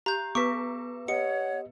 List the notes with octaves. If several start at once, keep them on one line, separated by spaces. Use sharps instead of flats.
G4 A#5 G6
B3 B4 C#6 D6 B6
G4 C#5 D#5 F#5 C#7